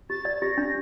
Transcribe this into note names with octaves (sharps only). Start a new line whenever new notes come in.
G4 A6
D5
G4 A#6
D4